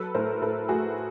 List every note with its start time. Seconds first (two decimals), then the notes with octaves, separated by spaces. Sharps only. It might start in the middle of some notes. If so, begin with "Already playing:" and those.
Already playing: F#3 A4 B4
0.15 A2 A#4 C5
0.42 A2 A4 B4
0.68 A3 F#4 G#4